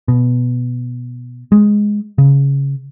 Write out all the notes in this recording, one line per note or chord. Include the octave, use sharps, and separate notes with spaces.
B2
G#3
C#3